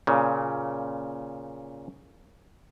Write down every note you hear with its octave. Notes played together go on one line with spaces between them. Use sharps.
A#2 C#3